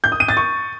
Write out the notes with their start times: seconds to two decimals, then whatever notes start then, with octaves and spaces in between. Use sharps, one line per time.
0.04 G6
0.12 D#6
0.20 D#7
0.28 A6
0.37 C#6